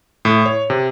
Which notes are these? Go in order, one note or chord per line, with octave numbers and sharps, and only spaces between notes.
A2
C#5
C3